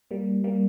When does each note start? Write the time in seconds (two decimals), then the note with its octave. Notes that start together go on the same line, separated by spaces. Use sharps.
0.11 G3 A#3
0.44 G3 A#3